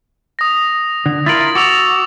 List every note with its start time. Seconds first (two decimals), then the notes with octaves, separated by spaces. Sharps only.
0.39 D#6 A#6
1.06 D3
1.26 E4 F4 A#4 A6 F#7
1.55 F#4 D6 E6 F7